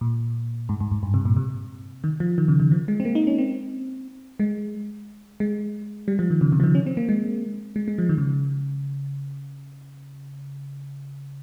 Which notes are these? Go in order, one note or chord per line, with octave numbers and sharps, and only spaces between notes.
A#2
G#2
G#2
G#2
G2
C3
A#2
C3
D#3
F3
D#3
C#3
D#3
F3
G#3
C4
A#3
D#4
C#4
C4
G#3
G#3
G3
F3
D#3
C#3
C3
F3
D#3
C#4
C4
A#3
G#3
G#3
G#3
F3
D#3
C#3